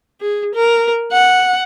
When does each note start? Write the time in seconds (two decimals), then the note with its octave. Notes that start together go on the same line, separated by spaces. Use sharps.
0.21 G#4
0.55 A#4
1.12 F#5